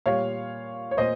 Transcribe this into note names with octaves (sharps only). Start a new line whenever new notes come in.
A#2 G3 C#5 F5
C#5
A#2 C5 D#5